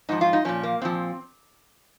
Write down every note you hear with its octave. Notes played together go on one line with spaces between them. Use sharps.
G#2 F3 D#4
F4
D#4
A#2 F3 C#4
A#3
A#2 F3 C4